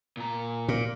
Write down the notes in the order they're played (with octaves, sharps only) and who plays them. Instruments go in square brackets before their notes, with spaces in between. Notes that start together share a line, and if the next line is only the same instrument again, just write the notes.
[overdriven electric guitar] A#2 A#5
[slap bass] A#2